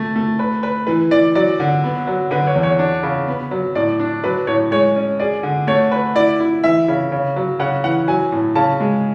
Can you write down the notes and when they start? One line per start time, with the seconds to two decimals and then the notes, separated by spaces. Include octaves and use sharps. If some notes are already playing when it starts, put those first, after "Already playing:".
Already playing: A3
0.16 A3
0.39 B4
0.63 B4
0.86 E3 B4
1.11 E3 D5
1.35 F#3 D5
1.60 D3
1.84 B3
2.07 F#3
2.31 D3 B4
2.47 C#5
2.55 E2
2.63 C#5
2.79 D4
3.03 C#3
3.28 B3
3.51 F#3
3.75 A2 D5
4.00 D4
4.23 F#3 B4
4.47 A2 C#5
4.71 G#3 C#5
4.96 C#4
5.20 G#4 D5
5.43 D3
5.67 A3 C#5
5.92 B4
6.15 E4 D5
6.40 E4
6.64 E3 E5
6.88 C#3
7.12 C#3
7.36 F#3
7.59 C#3 F#5
7.84 E3 F#5
8.07 F#3 G#5
8.32 A2
8.55 C#3 A5
8.80 G#3